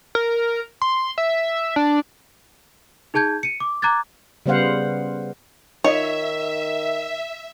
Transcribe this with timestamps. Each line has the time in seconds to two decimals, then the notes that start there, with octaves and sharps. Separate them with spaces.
0.15 A#4
0.82 C6
1.18 E5
1.76 D4
3.14 D#4 G#4 A5 G6 G#6
3.43 C#7 D#7
3.60 D6
3.82 A#5 D6 F#6 G#6 A6
4.46 C#3 G3 B3 C5 F5 F#5
5.84 D#3 D#4 F4 C#5 D#5 E5